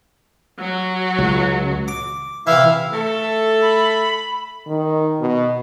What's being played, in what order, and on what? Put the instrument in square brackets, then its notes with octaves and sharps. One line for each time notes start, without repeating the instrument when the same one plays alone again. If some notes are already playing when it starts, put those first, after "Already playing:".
[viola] F#3 F#4
[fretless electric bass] C#2
[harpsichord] D6
[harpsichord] C3 E3 [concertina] E4 E5 F5
[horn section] A3 A4
[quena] B5
[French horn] D#3
B2